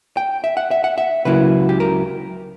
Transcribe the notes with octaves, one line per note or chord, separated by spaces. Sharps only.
G5
E5
F#5
E5
F#5
E5
C#2 C#3 F#3 A#3 E4 B4
G4
A#4